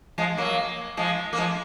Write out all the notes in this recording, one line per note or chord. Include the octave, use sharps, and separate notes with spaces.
F3 G#3
F#3 A#3
F3 G#3
A#3
F3 G#3